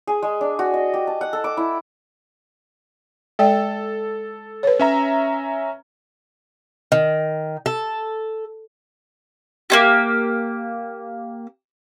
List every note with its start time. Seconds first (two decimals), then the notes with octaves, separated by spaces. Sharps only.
0.07 G#4
0.22 G#3
0.41 D4
0.59 F#4
0.74 D#5
0.94 G4
1.07 A5
1.21 F#5
1.33 A4
1.44 D6
1.57 E4
3.39 G#3 A4 D5 G5
4.63 B4 C#5
4.79 C#4 E5 A#5
6.92 D#3
7.66 A4
9.70 A#3 C#4 G4